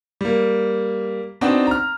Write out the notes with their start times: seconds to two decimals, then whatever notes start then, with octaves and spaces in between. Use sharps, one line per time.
0.21 G3 A#3
1.41 B3 C4 D4 D#4 F#4
1.67 A#5 F6